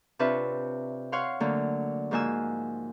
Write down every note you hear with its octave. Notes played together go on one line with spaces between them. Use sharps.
C3 D4 F4 B4 C#5 E5
C#5 F5 F#5 C6
D3 F#3 A3 A#3
G#2 F3 A#3 F#4 G#5 E6